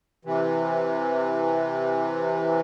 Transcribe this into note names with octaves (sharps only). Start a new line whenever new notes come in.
C3 E3